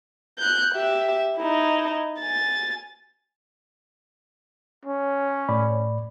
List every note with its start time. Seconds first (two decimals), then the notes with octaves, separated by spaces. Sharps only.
0.39 F#6 G6
0.75 G4 E5
1.37 D#4 E4
2.20 G#5 A6
4.86 C#4
5.49 A2 D5 B5